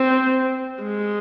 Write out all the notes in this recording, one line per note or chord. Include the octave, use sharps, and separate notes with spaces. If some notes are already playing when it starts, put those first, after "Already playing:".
Already playing: C4
G#3